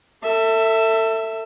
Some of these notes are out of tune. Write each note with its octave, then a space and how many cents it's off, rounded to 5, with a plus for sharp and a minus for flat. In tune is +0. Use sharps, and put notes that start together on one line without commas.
A4 +30 E5 +0